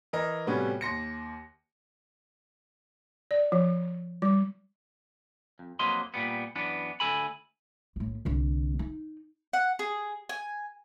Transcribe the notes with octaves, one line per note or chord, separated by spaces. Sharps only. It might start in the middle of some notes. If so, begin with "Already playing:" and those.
E3 A#4 D#5
A2 C3 G3 B3 C#4 F#4
D#2 C6 A#6 C#7
D5
F3
G3
F2
F2 F#3 A#3 B4 D#5 C6
A#2 G3 B3
F#2 E3 B3 D4
D2 A4 G#5 B5
A#1 A2
C2 D3
D#4
F#5
G#4
G#5